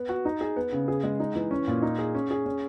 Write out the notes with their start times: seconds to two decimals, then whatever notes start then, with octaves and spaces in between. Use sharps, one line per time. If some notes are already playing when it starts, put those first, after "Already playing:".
Already playing: B3
0.09 F#4
0.25 D#4
0.41 G#4
0.56 B3
0.72 C#3
0.88 G#4
1.04 G#3
1.20 D#4
1.35 E3
1.51 C#4
1.67 A#2
1.82 D#4
1.99 G#4
2.15 C#4
2.31 G#4
2.46 C#4